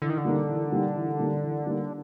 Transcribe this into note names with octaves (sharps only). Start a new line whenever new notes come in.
D3 E3
D#3
D3
G3 A#3 D#4
E3
G3 A#3 D#4
E3
G3 A#3 D#4
E3
G3 A#3 D#4